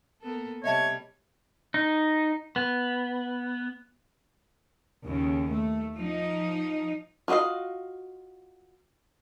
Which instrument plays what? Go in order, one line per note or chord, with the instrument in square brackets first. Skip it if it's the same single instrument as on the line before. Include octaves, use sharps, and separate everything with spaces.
[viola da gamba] A#3 B3 A4
[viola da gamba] C3 G3 [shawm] C#5 [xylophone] D#5 E5 A5
[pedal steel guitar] D#4
B3
[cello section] D#2 C#3
A3
F3 D#4
[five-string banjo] F4 F#4 B4 D#5 F5